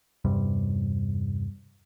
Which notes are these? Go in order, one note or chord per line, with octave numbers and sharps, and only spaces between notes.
E2 G2 C3 G3